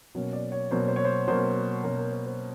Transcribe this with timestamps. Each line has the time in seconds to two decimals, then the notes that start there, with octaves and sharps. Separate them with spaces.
0.15 B2 F#3 A#3 C#4
0.33 D5
0.52 C#5
0.71 B2 F#3 A#3 C#4 C5
0.80 C#5
0.88 C5
0.96 C#5
1.05 C5
1.27 B2 F#3 A#3 C#4 C5
1.83 B2 F#3 A#3 C#4 A#4
1.98 A#4
2.12 C5
2.26 C5